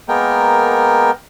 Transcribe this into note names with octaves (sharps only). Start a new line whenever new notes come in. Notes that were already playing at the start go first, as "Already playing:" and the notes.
G#3 A#3 B3 A#4 G5